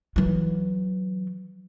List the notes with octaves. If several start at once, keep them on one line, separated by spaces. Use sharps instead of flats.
E3 F#3